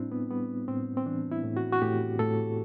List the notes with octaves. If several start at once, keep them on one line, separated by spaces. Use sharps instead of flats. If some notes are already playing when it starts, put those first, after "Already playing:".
Already playing: A2 G3 C4 D4 E4
B3
G3 B3
A2 C4
C4
E3 D4
E4
A2
F#4
F#4
A2 G4
A2 A4